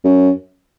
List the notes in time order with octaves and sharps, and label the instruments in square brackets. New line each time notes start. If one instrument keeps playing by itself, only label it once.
[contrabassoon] F#2